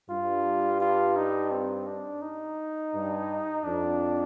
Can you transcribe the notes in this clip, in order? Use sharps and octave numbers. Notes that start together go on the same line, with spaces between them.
G2 F4
F4
D#4
C4
D4
D#4
G2
F2 D4